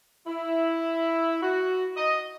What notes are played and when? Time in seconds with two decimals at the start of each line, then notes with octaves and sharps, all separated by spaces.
0.27 E4
1.43 F#4
1.97 D#5